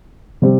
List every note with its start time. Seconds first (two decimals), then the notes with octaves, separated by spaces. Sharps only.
0.42 C3 G3 C4